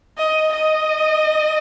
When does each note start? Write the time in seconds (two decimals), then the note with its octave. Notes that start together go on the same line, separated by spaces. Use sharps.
0.18 D#5
0.53 D#5